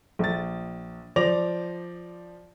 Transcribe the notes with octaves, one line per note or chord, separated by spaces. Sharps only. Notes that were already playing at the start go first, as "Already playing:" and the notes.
A#1 A6
F3 C5 D5 D6 A#6 F7